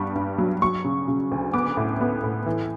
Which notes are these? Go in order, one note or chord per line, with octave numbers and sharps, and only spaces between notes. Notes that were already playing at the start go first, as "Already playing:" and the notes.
Already playing: G2 G3 B3 C#6
G2
F#3
F#3 C#6
C#3
C#3
D2
B3 D6
A2
B3
A2
E3